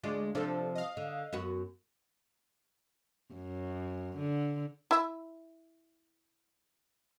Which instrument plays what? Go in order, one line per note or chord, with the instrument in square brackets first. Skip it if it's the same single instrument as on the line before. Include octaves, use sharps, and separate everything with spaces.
[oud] D2 G#3 F4 [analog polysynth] D5
[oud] C3 F3 [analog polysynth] D4 A4
[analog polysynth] D#5 F5
[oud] D3
F#2 B3 F#4
[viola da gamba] F#2
D3
[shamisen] E4 E5